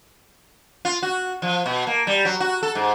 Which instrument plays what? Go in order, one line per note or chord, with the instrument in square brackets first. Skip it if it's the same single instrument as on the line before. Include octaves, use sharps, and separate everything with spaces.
[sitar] F4
F#4
F3
B2
A#3
G3
F#3
F#4
A4
G#2